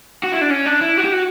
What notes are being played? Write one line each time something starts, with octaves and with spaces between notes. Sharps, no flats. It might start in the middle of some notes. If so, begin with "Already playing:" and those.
F#4
E4
D4
C#4
D4
E4
F#4
G4
F#4